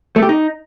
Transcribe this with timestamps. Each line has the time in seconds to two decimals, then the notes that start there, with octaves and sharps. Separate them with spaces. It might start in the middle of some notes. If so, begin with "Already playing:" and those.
0.16 A3
0.22 G4
0.29 D#4